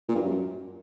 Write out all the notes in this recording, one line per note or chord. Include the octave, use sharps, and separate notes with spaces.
A#2
G2
F#2